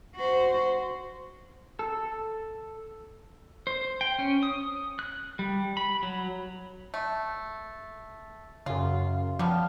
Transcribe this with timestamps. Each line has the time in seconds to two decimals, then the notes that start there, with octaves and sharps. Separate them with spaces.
0.16 F#4 C5
1.79 A4
3.67 C5
4.01 G5
4.19 C#4
4.43 D#6
4.99 F#6
5.39 G3
5.77 B5
6.03 F#3
6.94 A3
8.66 F#2 C#3 F4
9.39 F3 G3 B3 A5 F6